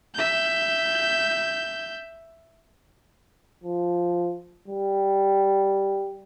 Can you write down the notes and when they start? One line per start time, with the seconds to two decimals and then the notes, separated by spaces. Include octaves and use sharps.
0.14 E5 G6
3.64 F3
4.68 G3